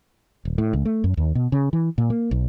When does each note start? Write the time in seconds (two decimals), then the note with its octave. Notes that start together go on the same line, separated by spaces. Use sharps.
0.45 D#1
0.58 A2
0.73 C#2
0.85 A3
1.04 F#2
1.17 D#2
1.35 B2
1.52 C#3
1.73 E3
1.98 A#2
2.10 A#3
2.31 B1